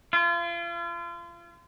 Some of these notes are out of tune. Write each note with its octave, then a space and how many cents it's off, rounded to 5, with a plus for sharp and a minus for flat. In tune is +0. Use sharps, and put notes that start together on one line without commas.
F4 -35